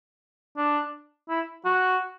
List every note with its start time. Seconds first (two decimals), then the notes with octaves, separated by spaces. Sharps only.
0.57 D4
1.29 E4
1.65 F#4